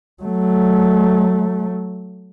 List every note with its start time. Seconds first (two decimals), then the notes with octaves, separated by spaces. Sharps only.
0.23 F#3 A3